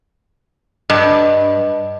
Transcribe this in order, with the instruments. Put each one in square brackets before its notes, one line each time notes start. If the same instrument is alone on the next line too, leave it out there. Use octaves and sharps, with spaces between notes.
[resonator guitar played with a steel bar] G2 [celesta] D#5